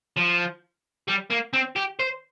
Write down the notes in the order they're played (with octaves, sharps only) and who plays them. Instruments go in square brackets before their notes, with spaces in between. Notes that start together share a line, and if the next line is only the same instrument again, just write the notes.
[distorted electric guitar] F3
G3
A#3
C4
G4
C5